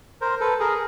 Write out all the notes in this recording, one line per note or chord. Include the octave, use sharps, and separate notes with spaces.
A#4 C5
A4 B4
G#4 A#4